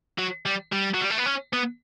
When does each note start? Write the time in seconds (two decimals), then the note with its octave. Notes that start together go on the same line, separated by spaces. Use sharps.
0.18 F#3
0.46 G3
0.72 G3
0.94 F#3
1.01 G3
1.10 A3
1.18 B3
1.26 C#4
1.53 B3